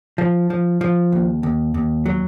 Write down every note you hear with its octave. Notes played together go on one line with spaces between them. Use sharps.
F3
F3
F3
D#2
D#2
D#2
F#3